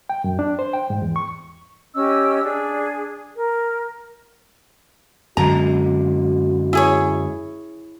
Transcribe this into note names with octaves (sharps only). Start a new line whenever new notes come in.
G5
F#2
D4
C5
G5
G#2
E2
C#6
C#4 G4 D#5 E6
D4 G#4 D5
A#4
F#2 D3 G#3 F#4 A#5
E4 G#4 C#5